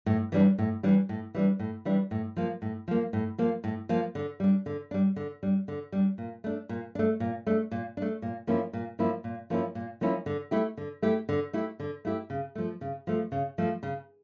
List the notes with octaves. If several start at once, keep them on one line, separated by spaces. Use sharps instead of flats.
A2
E3 G3 D4
A2
E3 G3 D4
A2
E3 G3 D4
A2
E3 G3 D4
A2
F3 A#3
A2
F3 A#3
A2
F3 A#3
A2
F3 A#3
D3
G3 D4
D3
G3 D4
D3
G3 D4
D3
G3 D4
A#2
A3 D4
A#2
A3 D4
A#2
A3 D4
A#2
A3 D4
A#2
F3 A#3 C#4 E4
A#2
F3 A#3 C#4 E4
A#2
F3 A#3 C#4 E4
A#2
F3 A#3 C#4 E4
D3
A3 E4 G4
D3
A3 E4 G4
D3
A3 E4 G4
D3
A3 E4 G4
C#3
F3 A3
C#3
F3 A3
C#3
F3 A3
C#3